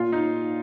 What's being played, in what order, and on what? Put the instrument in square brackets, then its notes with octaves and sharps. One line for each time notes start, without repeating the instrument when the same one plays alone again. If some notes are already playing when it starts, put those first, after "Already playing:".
Already playing: [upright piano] A#2 F4
D#4